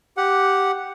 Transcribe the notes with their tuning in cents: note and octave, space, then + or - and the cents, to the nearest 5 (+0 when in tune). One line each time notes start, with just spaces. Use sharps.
G4 -5 F#5 +0